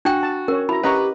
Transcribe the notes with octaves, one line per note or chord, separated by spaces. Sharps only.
D4 F#4 G5
A5
C#4 A#4 C#5
E4 F#4 A#5 B5
C#4 G4 B4 D#5 F#5 A#5 C#6